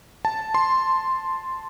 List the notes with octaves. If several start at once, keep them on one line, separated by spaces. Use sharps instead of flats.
A5
C6